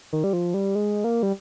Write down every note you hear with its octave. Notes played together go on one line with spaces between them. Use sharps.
D#3
G3
F3
G3
G#3
A#3
G3